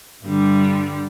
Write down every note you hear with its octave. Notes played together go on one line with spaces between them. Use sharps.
G2 D3 G3